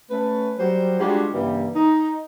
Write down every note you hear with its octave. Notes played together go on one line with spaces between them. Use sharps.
A3 C#4 B4
F#3 G3 C5
G3 G#3 D4 F4 F#4 G#4
G2 C#3 E3 G3 A#3
D#4